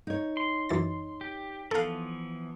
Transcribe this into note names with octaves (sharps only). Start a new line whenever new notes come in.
D#4 C#5
C6
F#2 E3 A6
G4
E3 F3 B3 A4 F5